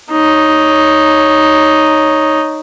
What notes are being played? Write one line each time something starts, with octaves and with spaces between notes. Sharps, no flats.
D#4 C#5